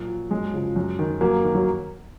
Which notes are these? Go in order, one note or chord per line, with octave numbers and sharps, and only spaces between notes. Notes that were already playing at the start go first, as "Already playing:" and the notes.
Already playing: A#2 F#3
F3
F#2 G#3
C#3 F3
F#2
D#3
F#2 F#3 A#3
D#3
F#3